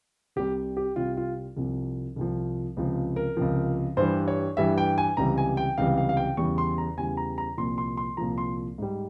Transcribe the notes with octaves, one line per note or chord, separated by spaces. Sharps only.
C2 C3 G3 G4
G4
C2 C3 G3 F4
F4
C2 C3 F3
C2 C3 F3
C#2 C3 F3
A#4
C#2 C3 F3
G2 E3 G3 C5
C#5
G2 E3 G3 E5
G5
G#5
C#2 C3 E3 G3 A#5
G#5
G5
C#2 C3 E3 G3 F5
F5
F5
G5
E2 C#3 E3 G3 C#6
C6
A#5
E2 C#3 E3 G3 G#5
A#5
A#5
C2 A#2 F3 C6
C6
C6
C2 A#2 F3 A#5
C6
G#2 G3